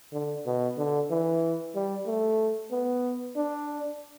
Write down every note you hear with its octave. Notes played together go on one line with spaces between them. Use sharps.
D3
B2
D3
E3
G3
A3
B3
D4